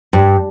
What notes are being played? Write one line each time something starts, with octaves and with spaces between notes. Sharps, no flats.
G2